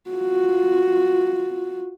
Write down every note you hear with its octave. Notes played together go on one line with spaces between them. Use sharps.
F4 F#4